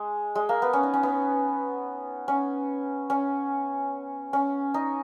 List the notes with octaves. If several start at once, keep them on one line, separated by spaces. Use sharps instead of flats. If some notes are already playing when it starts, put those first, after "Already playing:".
Already playing: G#3
G#3
A#3
B3
C#4
D#4
C#4
B3
C#4
C#4
C#4
D#4